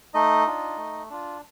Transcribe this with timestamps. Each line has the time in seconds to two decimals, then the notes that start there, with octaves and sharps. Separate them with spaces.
0.14 A3 D#4 D#5
0.46 D4 F4
0.77 A3
1.10 D4 F4